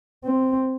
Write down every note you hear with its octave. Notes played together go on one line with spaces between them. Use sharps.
C4